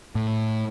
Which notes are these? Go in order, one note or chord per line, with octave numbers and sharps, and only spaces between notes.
A2